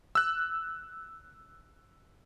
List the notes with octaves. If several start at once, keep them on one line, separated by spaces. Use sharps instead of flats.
E6 F#6